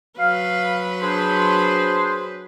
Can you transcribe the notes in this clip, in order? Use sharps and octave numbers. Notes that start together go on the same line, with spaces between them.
F#3 B4 F5
D4 G#4 C5